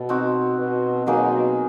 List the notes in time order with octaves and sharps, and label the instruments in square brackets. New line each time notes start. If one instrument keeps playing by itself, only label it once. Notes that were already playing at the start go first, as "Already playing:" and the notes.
Already playing: [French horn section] B2 [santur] A4
[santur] C4 D#4 F#4
[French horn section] B2
[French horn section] B2 [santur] F#3 A#3 D#4 G#4